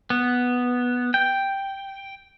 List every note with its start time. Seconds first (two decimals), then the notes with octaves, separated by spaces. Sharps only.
0.10 B3
1.14 G5